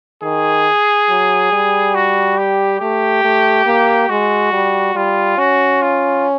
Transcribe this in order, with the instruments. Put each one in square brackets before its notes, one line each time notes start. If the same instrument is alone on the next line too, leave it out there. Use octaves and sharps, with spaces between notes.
[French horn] D#3 [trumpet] G#4
[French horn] F#3
G3
[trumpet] F#4
G4
[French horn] A3 [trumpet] G4
[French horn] A3
A#3
[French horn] G#3 [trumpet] F#4
[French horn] G3
[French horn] G3 [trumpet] F4
[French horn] C#4 [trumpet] F#4
[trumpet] F4